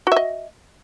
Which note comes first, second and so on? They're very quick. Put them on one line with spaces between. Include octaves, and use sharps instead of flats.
F#4 E5 D#5